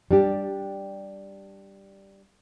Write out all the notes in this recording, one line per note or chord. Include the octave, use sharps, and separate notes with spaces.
G3 D4 G4